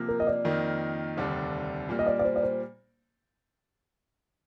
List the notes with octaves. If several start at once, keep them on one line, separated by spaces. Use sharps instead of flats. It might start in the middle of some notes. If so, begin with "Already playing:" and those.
Already playing: C3 F3 A#3
A#4
D#5
D5
F2 D#3 A#3 D#4
F1 D#2 D3 G3 D4
A#2 G3 A#3
D#5
D5
D5
C5
D5
C5